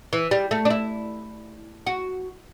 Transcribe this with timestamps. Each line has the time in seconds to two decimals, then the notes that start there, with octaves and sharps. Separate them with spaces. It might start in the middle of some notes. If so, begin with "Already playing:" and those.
0.13 E3
0.31 G3
0.51 A3
0.65 D4
0.70 E4
1.86 F#4